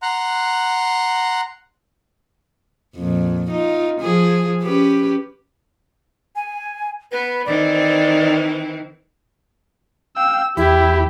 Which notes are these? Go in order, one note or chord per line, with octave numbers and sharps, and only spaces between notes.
F#5 A#5 C6 F#6
F2 A#2
D#4 F4
F3 G#4
C#4 G4 B4
G#5
B3 B4
D#3 E3 C4 D5
F5 G5 E6
E2 E4 G4 E5 B5